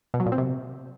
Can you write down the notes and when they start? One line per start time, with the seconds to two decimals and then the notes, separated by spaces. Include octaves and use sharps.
0.14 B2
0.20 F#3
0.26 A#2
0.32 C4
0.38 C3